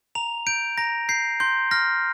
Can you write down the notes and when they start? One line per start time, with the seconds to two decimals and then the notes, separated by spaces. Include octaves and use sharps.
0.15 A#5 F7
0.47 G6 D7
0.78 A#5 A#6
1.09 G6 C7
1.40 C6 G6
1.71 F6 A#6